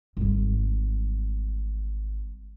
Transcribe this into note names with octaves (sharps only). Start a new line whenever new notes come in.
G#1 G3